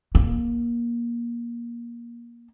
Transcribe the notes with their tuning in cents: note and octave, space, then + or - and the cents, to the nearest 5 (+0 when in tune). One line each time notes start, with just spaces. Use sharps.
A#3 +20